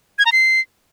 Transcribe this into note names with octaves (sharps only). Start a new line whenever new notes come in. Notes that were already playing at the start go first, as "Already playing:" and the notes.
G#6
A#5
C7